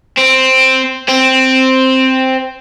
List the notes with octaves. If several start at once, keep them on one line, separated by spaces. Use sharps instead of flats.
C4
C4